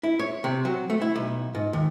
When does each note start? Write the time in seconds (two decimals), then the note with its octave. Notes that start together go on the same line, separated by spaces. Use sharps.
0.03 E4
0.19 C#5
0.44 C3
0.65 F#3
0.90 A3
1.01 E4
1.16 B1
1.55 G#2
1.73 D#2